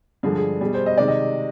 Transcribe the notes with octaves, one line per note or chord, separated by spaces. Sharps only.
G2 D3 F3 G#3 G#4
G#4
B2 G3 G#4
C5
D#5
C3 D#3 G#3 D5
D#5